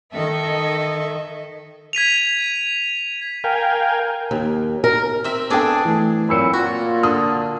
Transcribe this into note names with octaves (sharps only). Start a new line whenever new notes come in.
D#3 A4 D#5 E5
G#6 B6 D#7 F7
A#4 F5 G5 G#5
D#2
A#4
C4 E5
B3 D4 G#4 A4 D5 G5
E3 A3
A#2 F#3 C4 B5 E6 C#7
A#2 A#3 F4 F#4
D3 D#6